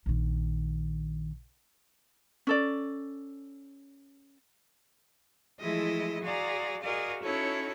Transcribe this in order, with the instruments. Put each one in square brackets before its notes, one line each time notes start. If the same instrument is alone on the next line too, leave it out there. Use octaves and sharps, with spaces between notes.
[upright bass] A#1 D#3
[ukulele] C#4 A4 D5
[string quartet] E3 F3 G#3 A3 E4 D#5
F#4 G#4 D5 F5 A#5
F#4 G#4 A#4 D5 D#5 F5
C#4 D#4 E4 F#4 A4 C#5